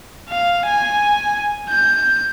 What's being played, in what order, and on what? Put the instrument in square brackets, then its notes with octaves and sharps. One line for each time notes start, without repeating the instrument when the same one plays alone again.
[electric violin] F5
G#5
G6